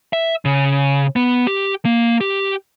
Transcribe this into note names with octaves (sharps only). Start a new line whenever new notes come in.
E5
C#3
B3
G4
A#3
G4